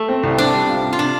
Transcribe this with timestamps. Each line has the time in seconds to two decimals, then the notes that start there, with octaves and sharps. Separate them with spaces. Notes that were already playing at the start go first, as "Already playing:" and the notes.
Already playing: A3
0.08 C4
0.23 C2
0.38 C4 D4
0.53 G3
0.69 F4
0.84 C3
0.93 F4
0.99 C3 D4